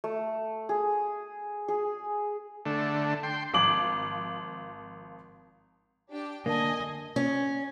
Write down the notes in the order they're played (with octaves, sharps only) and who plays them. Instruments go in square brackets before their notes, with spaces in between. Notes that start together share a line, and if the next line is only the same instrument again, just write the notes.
[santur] A3
G#4
G#4
[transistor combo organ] D3 A3
G5 C6
[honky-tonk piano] G#1 F3 D6 F#7
[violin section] D4 G4 G5
[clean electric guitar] D3 A#3 [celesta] A#4 D5 A5 [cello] D#5 [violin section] G#5
[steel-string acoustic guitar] C#4